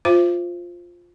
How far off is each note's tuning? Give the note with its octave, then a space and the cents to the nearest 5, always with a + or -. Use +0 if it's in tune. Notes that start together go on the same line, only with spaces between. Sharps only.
F4 +10 C5 +0 E5 +45